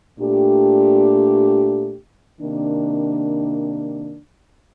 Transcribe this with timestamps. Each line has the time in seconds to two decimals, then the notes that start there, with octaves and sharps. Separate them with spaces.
0.18 A#2 A3 D4 G4
2.40 C3 D#3 A#3 D4